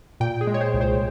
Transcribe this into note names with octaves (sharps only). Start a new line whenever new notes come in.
A#2 G5
G#4
G#3
C#5
C5
C2
C5